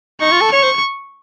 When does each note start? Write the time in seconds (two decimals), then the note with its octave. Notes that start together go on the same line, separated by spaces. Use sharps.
0.21 D#4 C#6
0.32 F4
0.41 A4
0.52 C#5 C#6
0.63 C5